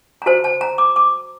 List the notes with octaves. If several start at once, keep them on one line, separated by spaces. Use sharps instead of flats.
A#5
F#4 C5 A5
A5
A#5
D6
D6